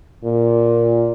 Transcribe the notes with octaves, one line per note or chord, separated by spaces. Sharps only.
A#2